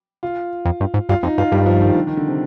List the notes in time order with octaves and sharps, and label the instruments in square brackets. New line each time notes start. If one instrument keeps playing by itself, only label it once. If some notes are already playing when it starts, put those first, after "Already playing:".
[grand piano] F4
[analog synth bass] F2
G2
G#2
[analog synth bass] G2 [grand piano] F4
[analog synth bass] F2 [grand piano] D#4
[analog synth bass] G2 [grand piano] F4
[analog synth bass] G2 [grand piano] G3
[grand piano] F3
D#3
D3
D#3
D3
C3